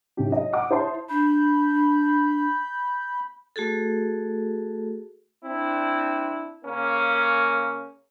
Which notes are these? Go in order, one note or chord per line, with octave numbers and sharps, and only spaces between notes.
B1 F#2 C3 C#4 D#4 G4
D#5
F#5 D6 D#6
E4 C5 E5 A5 C6
D4 B5 G6
A3 F#4 G#4 A4
C4 D4 E4
C#3 A#3 C#4